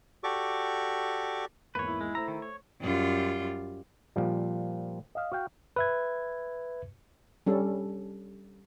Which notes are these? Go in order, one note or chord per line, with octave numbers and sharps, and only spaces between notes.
F#4 G4 A4 D5 C#6 D6
G#1 E2 A#3 B4 C#5
E4
G#3
A3 C5 A#5 E6
D#3
C#5
F#2 G3 F4
A#2 F3 G3
D#5 F5
F#4 F5 G5
B4 E5 G#6
G3 C#4 A4